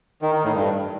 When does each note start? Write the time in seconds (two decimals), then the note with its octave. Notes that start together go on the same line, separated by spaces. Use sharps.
0.22 D#3
0.33 D#3
0.44 A2
0.54 G2